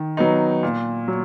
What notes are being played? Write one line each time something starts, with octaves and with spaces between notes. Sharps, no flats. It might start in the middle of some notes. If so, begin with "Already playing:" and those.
Already playing: D#3
F#3 B3 D#4
A#2
F#3